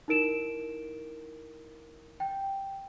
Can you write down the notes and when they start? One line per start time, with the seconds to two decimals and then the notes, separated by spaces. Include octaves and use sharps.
0.08 D#4 E4 A#4 D7 E7
2.20 G5